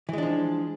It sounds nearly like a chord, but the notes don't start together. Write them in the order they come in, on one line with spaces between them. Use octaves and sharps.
E3 G#3 D4 F3